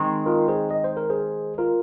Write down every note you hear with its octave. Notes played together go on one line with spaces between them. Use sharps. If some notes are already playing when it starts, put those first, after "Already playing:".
Already playing: D#3 G#3 C4
F4 A#4
G#4 C5
D#5
C5
A#4
G#4 C5
F4 A#4